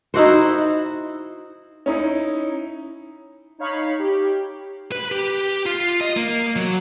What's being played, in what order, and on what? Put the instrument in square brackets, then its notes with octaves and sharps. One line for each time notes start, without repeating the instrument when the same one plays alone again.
[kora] D#4 E4 F#4 C5
[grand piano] C#4 D#4 E4
[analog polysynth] D#4 C#5 F5 B5
G4
[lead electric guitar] B4
G4
F4
D#5
A#3
F#3